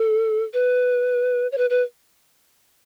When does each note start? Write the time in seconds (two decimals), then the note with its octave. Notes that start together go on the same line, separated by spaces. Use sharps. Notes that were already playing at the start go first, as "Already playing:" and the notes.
Already playing: A4
0.54 B4
1.52 C#5
1.58 B4
1.70 B4